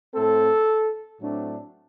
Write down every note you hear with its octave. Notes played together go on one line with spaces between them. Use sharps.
A2 A3 C4 A4
A2 F#3 A3 C4 D4